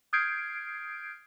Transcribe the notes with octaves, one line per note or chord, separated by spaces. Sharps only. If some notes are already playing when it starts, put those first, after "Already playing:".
D#6 F6 G6 G#6 C7 D7